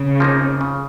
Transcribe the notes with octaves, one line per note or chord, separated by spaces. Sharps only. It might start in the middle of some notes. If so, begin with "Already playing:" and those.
Already playing: C#3
F3 A#3 D#4
C#3